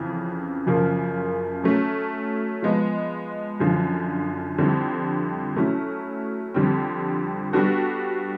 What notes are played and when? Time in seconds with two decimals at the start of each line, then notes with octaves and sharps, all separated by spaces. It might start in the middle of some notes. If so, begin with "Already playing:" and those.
Already playing: F2 C#3 E3
0.66 F#2 C#3 F3 A#3
1.64 F#3 A3 C#4
2.62 F3 G#3 B3
3.60 F#2 D3 F3
4.58 F2 D3 G3 C4 E4
5.56 F#3 A3 C#4 E4
6.54 F2 D3 G3 C4
7.53 G3 B3 D4 F#4 A4